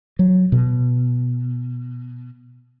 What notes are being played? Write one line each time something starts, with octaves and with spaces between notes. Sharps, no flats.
F#3
B2